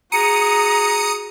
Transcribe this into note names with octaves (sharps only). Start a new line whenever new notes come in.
F#4 G#4 A#5 D#6 C#7